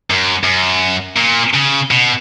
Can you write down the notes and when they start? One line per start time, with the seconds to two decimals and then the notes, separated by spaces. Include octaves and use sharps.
0.10 F#2
0.44 F#2
1.17 A#2
1.54 C#3
1.91 B2